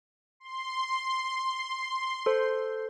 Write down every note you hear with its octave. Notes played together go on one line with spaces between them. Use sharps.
C6
A4 C5